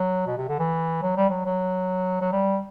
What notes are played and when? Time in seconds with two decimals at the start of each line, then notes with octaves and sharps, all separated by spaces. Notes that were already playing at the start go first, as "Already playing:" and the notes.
Already playing: F#3
0.27 B2
0.37 C3
0.48 D3
0.59 E3
1.02 F#3
1.17 G3
1.29 F#3
1.46 F#3
2.21 F#3
2.32 G3